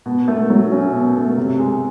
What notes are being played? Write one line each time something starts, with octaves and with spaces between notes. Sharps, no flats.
B2
A3
F#3
C#4
B2
A3
C3
G#3